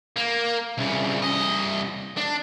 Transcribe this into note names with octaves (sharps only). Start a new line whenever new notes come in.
A#3
C2 C#3
C2 D#5
D4